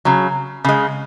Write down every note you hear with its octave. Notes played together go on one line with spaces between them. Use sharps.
C#3 F#3
C#3 G#3